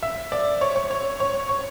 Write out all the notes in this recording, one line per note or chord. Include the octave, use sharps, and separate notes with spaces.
E5
D5
C#5
C#5
C#5
C#5
C#5